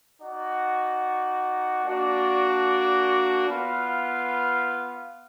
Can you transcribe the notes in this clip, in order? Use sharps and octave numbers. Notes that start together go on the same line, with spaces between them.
D#4 F#4 D5 F#5
A#3 D4 F#4 D5
B3 F4 B4 F5